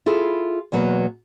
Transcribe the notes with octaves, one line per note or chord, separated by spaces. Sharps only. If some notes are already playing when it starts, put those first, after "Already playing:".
E4 F4 G#4 A4
E2 B2 F#3 A#3 B4